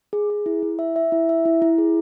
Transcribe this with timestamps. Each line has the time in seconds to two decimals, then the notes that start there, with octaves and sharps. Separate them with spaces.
0.13 G#4
0.30 G#4
0.46 E4
0.63 E4
0.79 E5
0.96 E5
1.12 E4
1.29 E5
1.45 E4
1.62 E4
1.78 G#4